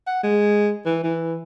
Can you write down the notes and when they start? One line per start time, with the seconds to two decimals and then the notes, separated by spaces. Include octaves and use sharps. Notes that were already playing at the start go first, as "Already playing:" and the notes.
0.07 F#5
0.23 G#3
0.86 E3
1.04 E3